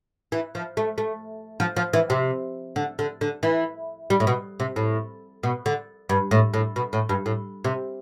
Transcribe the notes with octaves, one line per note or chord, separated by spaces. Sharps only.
E3
F3
A3
A3
F3
F3
E3
C3
D3
D3
D3
E3
G3
A2
B2
C3
A2
B2
D3
G2
A2
A2
B2
A2
G2
A2
C3